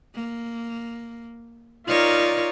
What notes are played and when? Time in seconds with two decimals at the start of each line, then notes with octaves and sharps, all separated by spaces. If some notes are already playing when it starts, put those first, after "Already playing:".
0.15 A#3
1.87 D#4 F4 A#4 C#5 D5